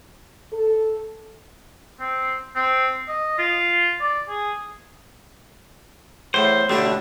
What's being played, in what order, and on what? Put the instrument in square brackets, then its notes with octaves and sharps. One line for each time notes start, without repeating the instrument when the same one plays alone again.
[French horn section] A4
[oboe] C4
C4
D#5
F4
D5
G#4
[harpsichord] E2 A2 [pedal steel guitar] C5
[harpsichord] A1 B2 D3 [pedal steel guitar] A3 D4